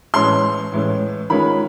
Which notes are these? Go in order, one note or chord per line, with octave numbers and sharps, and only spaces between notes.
A2 E3 G#3 C#4 C6
A2 E3 G#3 C#4
D#3 G#3 C#4 F4 B5